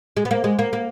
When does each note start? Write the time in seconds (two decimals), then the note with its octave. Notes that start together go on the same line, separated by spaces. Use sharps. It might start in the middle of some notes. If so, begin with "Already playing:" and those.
0.17 G#3
0.25 B3
0.31 A#3
0.44 G#3
0.59 A#3
0.73 A#3